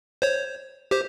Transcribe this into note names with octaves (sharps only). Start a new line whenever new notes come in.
C5 C#5
G4 C5